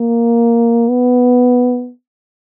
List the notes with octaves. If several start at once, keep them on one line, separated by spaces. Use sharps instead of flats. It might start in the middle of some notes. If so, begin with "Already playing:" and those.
Already playing: A#3
B3